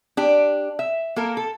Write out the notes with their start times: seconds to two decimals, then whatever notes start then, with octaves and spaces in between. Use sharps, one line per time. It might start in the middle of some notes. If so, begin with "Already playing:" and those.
0.17 D4 G4
0.79 E5
1.16 A#3 A4 A#4
1.37 A4